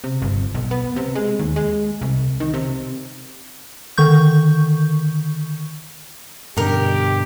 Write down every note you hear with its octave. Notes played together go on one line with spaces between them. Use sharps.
C3
G1
B1
B3
C3
G#3
D#2
G#3
C2
D#3
C3
D3 D#3 C#6 G6
G2 B2 D3 D#4 G4 A#4